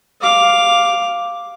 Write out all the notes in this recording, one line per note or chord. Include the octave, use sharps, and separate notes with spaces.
F5 D6